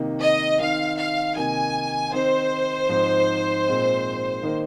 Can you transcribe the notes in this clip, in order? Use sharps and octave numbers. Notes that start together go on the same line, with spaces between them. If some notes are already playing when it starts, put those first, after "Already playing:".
Already playing: C3 D#3 A#3 D#4
D#5
D#3 C4 D#4 F5
F5
C3 D#3 A#3 D#4 G#5
D#3 C4 D#4 C5
G#2 F3 C4 D#4
A#2 G#3 C4 D#4
D#3 A#3 D#4